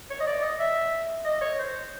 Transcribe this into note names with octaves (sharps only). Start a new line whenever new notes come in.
C#5
D#5
D5
D#5
E5
D#5
C#5
C5